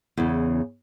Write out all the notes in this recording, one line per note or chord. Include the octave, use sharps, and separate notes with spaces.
E2 C#3